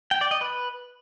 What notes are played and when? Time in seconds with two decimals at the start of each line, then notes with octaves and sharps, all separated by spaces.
0.11 G5
0.21 D5
0.31 D#5
0.41 B4